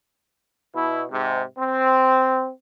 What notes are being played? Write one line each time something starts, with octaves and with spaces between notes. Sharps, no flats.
B2 E4
G#2 C3
C4